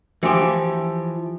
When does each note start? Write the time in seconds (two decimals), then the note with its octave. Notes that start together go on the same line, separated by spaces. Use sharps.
0.23 E3 F3 G4